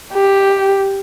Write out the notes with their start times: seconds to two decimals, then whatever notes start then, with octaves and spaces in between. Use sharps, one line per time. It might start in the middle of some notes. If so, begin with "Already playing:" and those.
0.14 G4